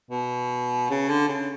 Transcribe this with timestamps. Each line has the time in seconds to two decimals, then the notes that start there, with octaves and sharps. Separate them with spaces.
0.11 B2
0.90 C#3
1.09 D3
1.28 C#3